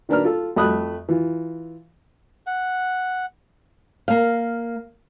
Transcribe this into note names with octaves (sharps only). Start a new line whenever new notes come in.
D#3 A#3 D4 B4 A#5 F6
F4 A4
F2 A3 B5 D#6 F#6
E3 F4
F#5
A#3 F5